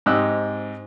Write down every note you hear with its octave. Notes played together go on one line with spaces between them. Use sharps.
G#2 C4 G4 D#5 E6 F#6